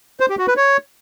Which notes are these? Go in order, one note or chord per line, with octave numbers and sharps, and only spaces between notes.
C5
G4
F#4
B4
C#5